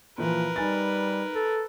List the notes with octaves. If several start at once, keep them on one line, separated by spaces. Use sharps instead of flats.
A#2 E3 F3 A#4 B4
G3 D#4 G#5 A6
A4